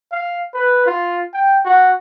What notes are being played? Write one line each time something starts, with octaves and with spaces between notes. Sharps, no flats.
F5
B4
F4
G5
F#4